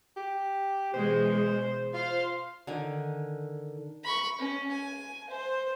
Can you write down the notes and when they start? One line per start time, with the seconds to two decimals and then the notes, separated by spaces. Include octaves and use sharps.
0.17 G4
0.94 B2 E3 G#3 C5
1.94 F4 C5 F5 C6
2.67 D3 D#3 G#5
4.04 B5 C#6
4.39 C#4
4.71 G#5
5.30 C5